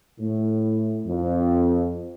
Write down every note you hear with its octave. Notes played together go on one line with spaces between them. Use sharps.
A2
F2